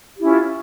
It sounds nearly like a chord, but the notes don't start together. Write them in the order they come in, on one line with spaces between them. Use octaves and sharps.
G4 E4 C#4 F4